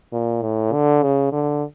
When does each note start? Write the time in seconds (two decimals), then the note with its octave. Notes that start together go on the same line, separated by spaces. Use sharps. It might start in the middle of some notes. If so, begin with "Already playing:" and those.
0.13 A#2
0.42 A2
0.73 D3
1.03 C#3
1.32 D3